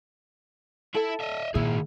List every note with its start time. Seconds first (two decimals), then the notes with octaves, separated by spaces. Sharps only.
0.95 E4 A4 E5
1.21 D#5 E5
1.55 A#2 D#3 E4 G#4